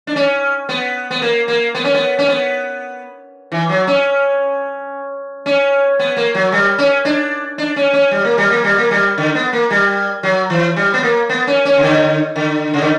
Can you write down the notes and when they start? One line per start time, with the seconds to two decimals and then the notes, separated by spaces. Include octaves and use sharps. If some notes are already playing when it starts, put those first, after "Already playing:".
0.07 D4
0.16 C#4
0.69 B3
1.11 B3
1.22 A#3
1.48 A#3
1.75 B3
1.84 C#4
1.94 B3
2.19 C#4
2.28 B3
3.52 E3
3.69 F#3
3.87 C#4
5.46 C#4
5.99 B3
6.17 A#3
6.35 F#3
6.52 G3
6.78 C#4
7.05 D4
7.58 D4
7.76 C#4
7.93 C#4
8.11 G3
8.25 A#3
8.38 G3
8.51 A#3
8.64 G3
8.78 A#3
8.91 G3
9.18 D3
9.35 B3
9.53 A#3
9.71 G3
10.23 F#3
10.50 E3
10.76 G3
10.94 B3
11.03 A#3
11.29 B3
11.47 C#4
11.65 C#4
11.77 C#3
11.83 D3
12.36 D3
12.74 C#3
12.81 D3